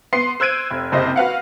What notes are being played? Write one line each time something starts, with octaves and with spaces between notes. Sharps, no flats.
B3 C6 C7
C5 E6 F#6 G#6 D7 D#7
F1
F#1 C3 C5 D#5
F#4 B4 F5 F#5